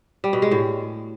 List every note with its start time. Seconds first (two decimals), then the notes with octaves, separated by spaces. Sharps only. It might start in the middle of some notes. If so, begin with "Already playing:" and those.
0.24 G3
0.33 B2
0.42 G#3
0.51 A2